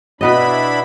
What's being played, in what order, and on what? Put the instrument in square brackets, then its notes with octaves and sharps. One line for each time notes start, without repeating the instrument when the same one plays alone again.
[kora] B2 B3 D#5 [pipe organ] D4 E4 B5